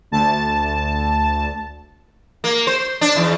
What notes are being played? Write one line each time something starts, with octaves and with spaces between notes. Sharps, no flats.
D2 A5
A#3
C5
D4
E2